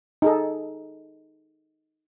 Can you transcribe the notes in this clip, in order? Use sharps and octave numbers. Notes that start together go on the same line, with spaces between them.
D#4 G#4 A4